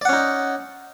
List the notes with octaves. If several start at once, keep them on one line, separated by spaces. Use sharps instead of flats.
C#4 D#4 D5 F#5